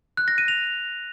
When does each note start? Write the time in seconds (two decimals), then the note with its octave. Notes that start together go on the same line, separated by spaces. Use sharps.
0.17 F#6
0.28 A#6
0.38 D#7
0.48 F7